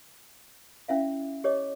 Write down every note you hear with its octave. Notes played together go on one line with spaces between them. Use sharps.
C#4 E4 E5 F5
G4 C#5 D#5 D6